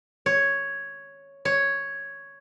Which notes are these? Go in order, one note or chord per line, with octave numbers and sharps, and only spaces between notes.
C#5
C#5